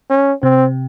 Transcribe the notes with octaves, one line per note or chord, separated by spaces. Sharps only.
C#4
C3 C4